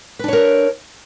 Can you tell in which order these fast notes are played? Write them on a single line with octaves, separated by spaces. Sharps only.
B4 D4 C#5 A#4